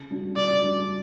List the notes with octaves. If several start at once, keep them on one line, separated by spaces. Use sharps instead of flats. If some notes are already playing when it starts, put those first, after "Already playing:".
Already playing: C#3
G3 D4 F#4
C#3 D5
G3 D4 F#4